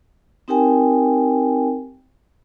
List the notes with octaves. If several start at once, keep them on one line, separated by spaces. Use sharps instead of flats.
C4 D#4 G4 A#4 G5 G#5